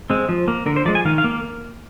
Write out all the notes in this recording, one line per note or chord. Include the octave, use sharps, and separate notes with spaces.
G#3 C4
F3
A#3
D3 A#4
C5
F3 G#3 D5
G#5
D#3 F5
F5
A#3